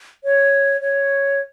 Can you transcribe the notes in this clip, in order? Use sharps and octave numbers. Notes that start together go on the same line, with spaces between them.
C#5
C#5